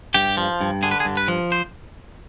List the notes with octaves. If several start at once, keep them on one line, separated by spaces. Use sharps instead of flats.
G2 G4
F3
G2
D3 G#4
B4
G#4
G2
B4
F3
C5